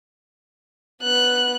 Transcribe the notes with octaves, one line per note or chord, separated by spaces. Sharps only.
B3 F#6